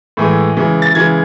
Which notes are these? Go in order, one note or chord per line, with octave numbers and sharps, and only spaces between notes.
A2 E3 G#3
C#3 E3 G#3
A6
C#3 E3 G#3 G#6